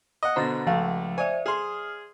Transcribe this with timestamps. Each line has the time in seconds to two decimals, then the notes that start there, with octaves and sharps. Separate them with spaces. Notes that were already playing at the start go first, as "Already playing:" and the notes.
0.23 D#5 F#5
0.36 B2 D3 C5 A#5 A6 A#6
0.67 C#2 F3 A3 F5
1.18 C5 D5 E5 G#5
1.46 G#4 C6 D#6 F6